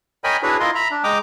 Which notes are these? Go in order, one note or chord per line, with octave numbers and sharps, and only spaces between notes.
A#4 C#5 D#5 G5 G#5 B5
D4 E4 F#4 G#4 B4 C#5
E4 F4 A#4 D#5 C6
E5 A#5 B5
D4
G#3 D#5 G5 A#5 D6 D#6